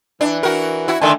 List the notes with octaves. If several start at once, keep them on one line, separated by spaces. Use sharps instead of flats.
E3 D4
F#4 A#4
E4 F#4
D3 D#3 A3 D4 G#5